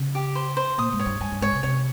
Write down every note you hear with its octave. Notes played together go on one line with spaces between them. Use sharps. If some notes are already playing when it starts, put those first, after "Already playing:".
Already playing: C#3
G4
C5
C5
A#2 D#6
G#2
C#5
G2
G2 G#5
G2
G#2 C#5
C3
C3 C#5